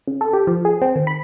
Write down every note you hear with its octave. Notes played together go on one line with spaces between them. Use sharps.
C#3
A4
G4
F3
G#4
C4
D#3
B5